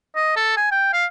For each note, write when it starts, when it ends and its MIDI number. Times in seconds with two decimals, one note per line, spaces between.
0.16 0.35 75
0.37 0.56 69
0.57 0.70 80
0.71 0.88 79
0.93 1.05 77